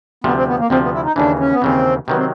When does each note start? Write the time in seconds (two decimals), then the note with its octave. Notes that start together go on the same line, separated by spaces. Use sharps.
0.24 D2 C3 F3 B3
0.36 C4
0.47 B3
0.59 A#3
0.70 D2 C3 F3 C4
0.82 B3
0.93 E4
1.04 D#4
1.16 D#2 C#3 E3 D4
1.39 C#4
1.52 B3
1.62 D#2 C#3 E3 C4
2.08 C3 D#3 F#3 B3
2.16 C4